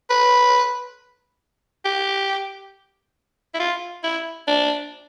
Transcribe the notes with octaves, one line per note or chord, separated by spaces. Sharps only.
B4
G4
E4
F4
E4
D4